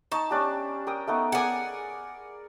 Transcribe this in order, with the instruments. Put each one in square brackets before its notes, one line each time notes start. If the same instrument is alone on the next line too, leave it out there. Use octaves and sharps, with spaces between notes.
[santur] D#4 C#6 [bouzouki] A5
[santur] C#4 D4 G4
A#4 G5 D#6
A3 B3 D#4
[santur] G#4 A#4 D5 [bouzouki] F#5 G#5